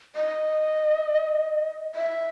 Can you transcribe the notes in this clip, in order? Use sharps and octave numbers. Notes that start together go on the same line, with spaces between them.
D#5
E5